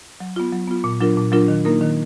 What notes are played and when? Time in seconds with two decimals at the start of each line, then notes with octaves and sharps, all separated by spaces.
0.20 F#3
0.36 B3 F4
0.52 F#3
0.68 B3 F4
0.84 A#2
1.01 F#3 D4 F4 A#4
1.17 A#2
1.32 F#3 D4 F4 A#4
1.48 D#3
1.65 A#3 D#4 A#4
1.81 D#3